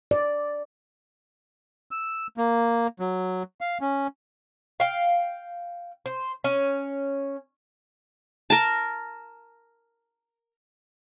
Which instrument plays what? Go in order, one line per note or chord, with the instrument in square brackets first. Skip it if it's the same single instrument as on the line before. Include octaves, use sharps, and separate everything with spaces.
[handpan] D5
[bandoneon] E6
A#3
F#3
F5
C#4
[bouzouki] F5 G5
C5
C#4
[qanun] A#4 A5